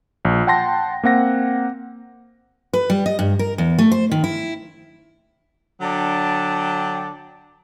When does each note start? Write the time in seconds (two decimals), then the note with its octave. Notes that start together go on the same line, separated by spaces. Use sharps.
0.25 A#1
0.47 F#5 G5 A5 C6 A#6
1.03 A#3 C4 F#5 A#6
2.73 B4
2.90 G3
3.06 D#5
3.19 G2
3.39 A#4
3.58 E2
3.79 A3
3.92 C5
4.11 D#3
4.24 E4
5.81 D3 F#3 D4 G5 A5